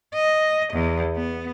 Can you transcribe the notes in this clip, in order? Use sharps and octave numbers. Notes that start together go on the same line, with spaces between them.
D#5
E2
B3